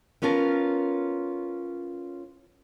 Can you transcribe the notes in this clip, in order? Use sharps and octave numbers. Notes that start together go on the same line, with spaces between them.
B3 C#4 F4 A#4 A5